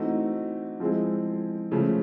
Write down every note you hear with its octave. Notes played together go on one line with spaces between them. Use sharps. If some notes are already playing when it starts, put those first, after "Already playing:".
Already playing: E3 A3 C4 D#4 F#4
F3 G#3 C4 E4 G#4
C#3 F3 A3